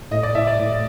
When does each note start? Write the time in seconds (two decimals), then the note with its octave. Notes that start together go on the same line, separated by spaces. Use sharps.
0.11 A2 D#5
0.23 D5
0.35 A2 E5
0.47 D5
0.59 A2